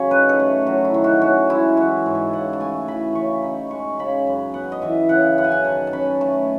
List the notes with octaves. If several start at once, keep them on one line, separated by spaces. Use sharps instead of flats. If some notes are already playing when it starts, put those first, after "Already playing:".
Already playing: C#3 F#3 C#4 C#5 B5
D#4 B4
A4
A3
F#3 F#4
E4
D#3
F#4
C#4 F#4
G#3 E4
E3 F#4
G#2
A4
C#3 F#5
A5
A3 G#5
E3 B5
C#3 C#6
D#4 B5
G#3 C#6
C#6
C#3 B5
F#2
B3 F#5
D#5
E3 E5
C#3 F#5
F#2 F#5
G#5
F#5
D#3 A5
A5
C#4 B5
A3 A5